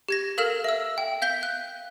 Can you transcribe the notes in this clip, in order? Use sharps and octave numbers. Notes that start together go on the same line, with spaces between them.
G4 G#6 A#6
A4 A#4 F5 F6 E7 F#7
E5 E6
G5
F5 G6 B6 G7
F#6